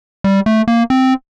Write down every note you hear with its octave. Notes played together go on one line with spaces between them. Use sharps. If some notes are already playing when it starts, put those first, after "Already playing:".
G3
A3
A#3
C4